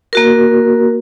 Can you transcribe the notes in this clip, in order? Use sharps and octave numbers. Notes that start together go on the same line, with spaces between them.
A#3 F#4 A#4